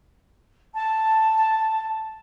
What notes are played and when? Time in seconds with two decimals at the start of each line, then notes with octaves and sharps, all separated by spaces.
0.73 A5